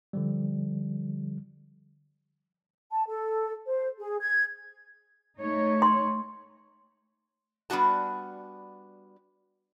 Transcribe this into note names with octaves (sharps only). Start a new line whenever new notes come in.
D3 F3 G3
A5
A4
C5
G#4
G#6
A3 D#4 C#5
C6
G3 B3 D4 F#4 A5